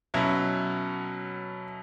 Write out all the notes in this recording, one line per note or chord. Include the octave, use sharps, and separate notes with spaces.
B2 F#3 C#4 E4